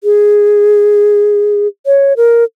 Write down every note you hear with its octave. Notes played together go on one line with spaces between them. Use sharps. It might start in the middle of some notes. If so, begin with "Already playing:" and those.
G#4
C#5
A#4